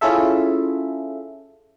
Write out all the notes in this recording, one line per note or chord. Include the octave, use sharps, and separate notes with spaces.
C#4 E4 F4 G#4 A4 E5